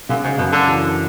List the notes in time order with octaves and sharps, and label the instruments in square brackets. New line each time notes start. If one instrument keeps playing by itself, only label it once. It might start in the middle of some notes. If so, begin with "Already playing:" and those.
[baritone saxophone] F#2 [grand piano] C#3
[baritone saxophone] G#2
[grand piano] F#2 [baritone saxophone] B2
[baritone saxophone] D3
[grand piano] E3